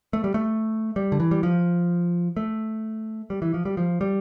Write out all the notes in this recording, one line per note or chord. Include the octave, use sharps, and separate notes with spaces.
A3
G3
A3
G3
D3
E3
G3
F3
A3
G3
E3
F3
G3
F3
G3